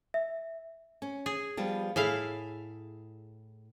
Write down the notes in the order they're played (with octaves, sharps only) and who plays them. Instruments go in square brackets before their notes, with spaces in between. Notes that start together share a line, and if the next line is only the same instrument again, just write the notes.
[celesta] E5
[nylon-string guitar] C#4
[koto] G#4
[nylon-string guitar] F3 G3 B3
[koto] A2 E4 F5 [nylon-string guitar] G#4